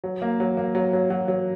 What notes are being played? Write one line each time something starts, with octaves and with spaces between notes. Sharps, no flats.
F#3
A#3
F#3
A#3
F#3
F#3
F#3
F#3